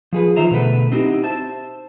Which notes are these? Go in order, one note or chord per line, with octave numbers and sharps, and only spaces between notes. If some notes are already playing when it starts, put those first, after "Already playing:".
F3 G#4 B4
E3 D#4 F4 C5 E5 A#5
B2 D3 A3 B4
C4 D#4 E4 F#4 G4
C5 E5 A5